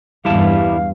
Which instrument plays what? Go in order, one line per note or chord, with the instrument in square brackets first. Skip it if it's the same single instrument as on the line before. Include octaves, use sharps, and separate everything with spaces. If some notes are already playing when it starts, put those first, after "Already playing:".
[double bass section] E2 G2 [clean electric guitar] G3 E4 A5 [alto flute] F5